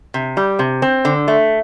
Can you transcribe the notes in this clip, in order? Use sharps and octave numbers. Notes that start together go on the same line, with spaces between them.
C3
G3
C3
C4
D3
A3